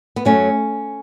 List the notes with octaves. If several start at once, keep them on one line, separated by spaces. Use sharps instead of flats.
B3
F#2 F#3 A3 C#4